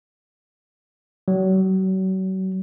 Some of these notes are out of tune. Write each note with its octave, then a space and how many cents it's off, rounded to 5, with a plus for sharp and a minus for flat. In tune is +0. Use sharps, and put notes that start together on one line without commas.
F#3 +35